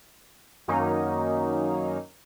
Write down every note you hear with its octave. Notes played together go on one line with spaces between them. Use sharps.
F#2 D#3 F#3 A#3 C#4 D#4